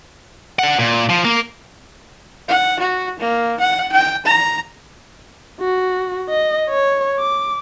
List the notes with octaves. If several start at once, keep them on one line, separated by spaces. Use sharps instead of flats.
D4 F#5
A#2
F3
A#3
F#5
F#4
A#3
F#5
G5
A#5
F#4
D#5
C#5
D6